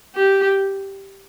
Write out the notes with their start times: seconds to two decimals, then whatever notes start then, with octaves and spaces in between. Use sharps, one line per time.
0.15 G4